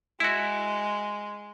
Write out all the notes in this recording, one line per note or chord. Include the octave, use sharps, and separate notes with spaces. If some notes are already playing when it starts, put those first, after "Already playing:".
G#3 E4 F#4